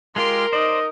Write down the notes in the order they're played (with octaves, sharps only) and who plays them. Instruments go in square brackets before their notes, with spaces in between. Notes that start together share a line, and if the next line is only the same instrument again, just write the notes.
[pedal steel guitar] G#3 F4 G4 [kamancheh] A#4 [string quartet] F5 C6 F6
[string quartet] D#4 [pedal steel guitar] C5 D5 [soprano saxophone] D#5